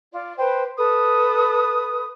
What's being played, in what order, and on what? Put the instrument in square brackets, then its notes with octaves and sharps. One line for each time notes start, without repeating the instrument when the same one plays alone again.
[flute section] F4 D5
B4 C5 G5
A4 B4 D#6